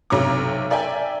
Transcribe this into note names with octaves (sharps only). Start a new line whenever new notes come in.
B1 C3 F#3 C#5 A#5 D6
A#4 D5 E5 G5 G#5